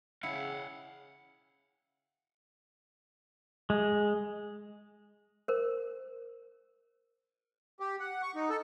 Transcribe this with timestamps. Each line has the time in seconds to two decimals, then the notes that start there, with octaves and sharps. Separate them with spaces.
0.23 C#3 E4 F5 F#5 C#7
3.70 G#3
5.48 A#4 C5
7.80 G4
8.00 F#5
8.22 C#6
8.35 D#4
8.50 A4